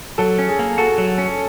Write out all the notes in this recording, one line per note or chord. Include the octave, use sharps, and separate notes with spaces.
F#3 A4
C#4
G#4
A#3
F#4 A4
F#3
C#4